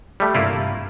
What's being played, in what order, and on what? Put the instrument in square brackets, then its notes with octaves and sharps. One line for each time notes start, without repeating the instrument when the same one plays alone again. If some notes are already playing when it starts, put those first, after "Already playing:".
[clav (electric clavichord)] G3 A3
[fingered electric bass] G2 C3 [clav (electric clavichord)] A#3 E4 F4